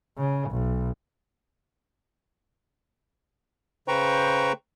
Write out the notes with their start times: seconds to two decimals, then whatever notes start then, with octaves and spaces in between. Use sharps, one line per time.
0.18 C#3
0.50 B1
3.88 C#3 B4 C5 G5 A#5 C#6